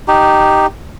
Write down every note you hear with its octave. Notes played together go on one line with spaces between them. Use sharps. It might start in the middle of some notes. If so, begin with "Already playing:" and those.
D#4 G4